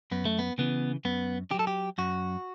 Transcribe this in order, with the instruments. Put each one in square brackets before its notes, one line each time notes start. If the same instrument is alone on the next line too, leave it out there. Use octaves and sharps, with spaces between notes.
[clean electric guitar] F#2 B3
A3
B3
C#3 E3 B3
F#2 B3
D3 G4
F#3
A4
G4
F#2 F#4